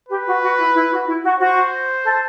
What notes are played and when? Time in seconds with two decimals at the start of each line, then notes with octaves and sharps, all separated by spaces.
0.09 G4 B4
0.26 F#4
0.42 F#4
0.58 E4
0.74 E4
0.91 F#4
1.06 E4
1.23 F#4
1.39 F#4 C5
2.04 A4